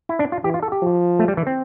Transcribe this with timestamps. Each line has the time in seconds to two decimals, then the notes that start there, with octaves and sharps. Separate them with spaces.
0.09 E4
0.19 D4
0.32 F4
0.44 E3 G4
0.54 F4
0.63 A4
0.72 G4
0.82 F3
1.19 A3
1.28 G3
1.37 E3
1.47 C4